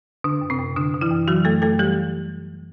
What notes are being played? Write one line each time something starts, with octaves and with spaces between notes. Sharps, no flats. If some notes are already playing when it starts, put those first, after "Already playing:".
D3 D4
F#2
C3 C4
F#2
D3 D4
D3
E3 E4
F#2
E3 F#3 F#4
F#2 A3 A4
F#2 A3 A4
E3 G3 G4